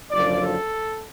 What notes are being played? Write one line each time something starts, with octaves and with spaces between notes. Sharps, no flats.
F#1 F#2 D3 F3 D5
A4